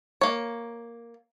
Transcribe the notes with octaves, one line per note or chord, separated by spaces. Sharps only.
A#3 C#5